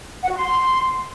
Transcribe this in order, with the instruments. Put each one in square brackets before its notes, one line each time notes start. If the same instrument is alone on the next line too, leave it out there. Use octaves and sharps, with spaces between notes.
[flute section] F#5
F#4
C6